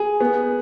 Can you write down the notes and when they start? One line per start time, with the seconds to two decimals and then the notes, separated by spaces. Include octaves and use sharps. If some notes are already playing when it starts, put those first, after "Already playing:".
Already playing: G#4
0.20 B3